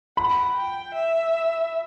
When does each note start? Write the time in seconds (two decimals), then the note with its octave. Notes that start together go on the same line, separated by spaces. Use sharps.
0.17 F#5 B5
0.57 G5
0.94 E5